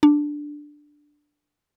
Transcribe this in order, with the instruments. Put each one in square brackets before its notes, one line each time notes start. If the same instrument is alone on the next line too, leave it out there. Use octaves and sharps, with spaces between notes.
[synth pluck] D4